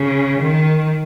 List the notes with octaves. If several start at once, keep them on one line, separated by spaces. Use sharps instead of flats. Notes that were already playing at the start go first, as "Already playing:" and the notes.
Already playing: C#3
D#3